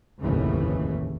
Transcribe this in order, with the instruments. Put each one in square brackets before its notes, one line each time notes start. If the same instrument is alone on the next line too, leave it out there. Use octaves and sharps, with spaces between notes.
[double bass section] F1 A#1 D#2 A2 C#3 E3